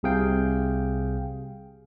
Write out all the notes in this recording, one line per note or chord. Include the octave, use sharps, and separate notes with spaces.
C2 C3 G#4 F5 G5